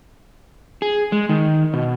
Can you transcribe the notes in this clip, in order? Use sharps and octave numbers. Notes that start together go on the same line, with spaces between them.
G#4
G#3
D#3
B2